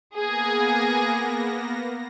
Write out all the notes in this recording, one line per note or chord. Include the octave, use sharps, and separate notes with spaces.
A#3 B3 G#4 A#6